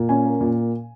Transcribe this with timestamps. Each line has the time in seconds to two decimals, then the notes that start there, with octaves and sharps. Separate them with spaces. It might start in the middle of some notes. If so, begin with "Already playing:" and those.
Already playing: A#2
0.09 C#4 G#5
0.25 A#3
0.41 A#2